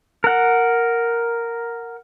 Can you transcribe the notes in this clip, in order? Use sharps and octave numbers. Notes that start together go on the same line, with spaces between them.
A#4 F#5